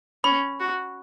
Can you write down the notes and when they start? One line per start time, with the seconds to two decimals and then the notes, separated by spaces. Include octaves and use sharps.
0.24 C#4 B5
0.60 F#4